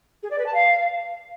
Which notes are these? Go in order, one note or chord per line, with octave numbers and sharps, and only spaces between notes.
G#4
D5
B4
A5
F5